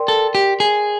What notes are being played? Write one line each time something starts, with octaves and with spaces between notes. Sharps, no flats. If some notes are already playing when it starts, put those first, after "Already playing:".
Already playing: A#4 D5 G5 C6
A4
G4
G#4